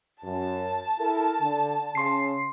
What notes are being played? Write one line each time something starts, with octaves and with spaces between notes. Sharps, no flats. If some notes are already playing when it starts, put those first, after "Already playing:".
F#2 A5
E4 A4 A#4
D3
C#3 C6 C7